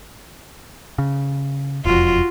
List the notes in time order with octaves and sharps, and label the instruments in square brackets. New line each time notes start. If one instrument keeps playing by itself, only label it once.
[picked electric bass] C#3
[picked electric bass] E1 F2 [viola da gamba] F4 F#4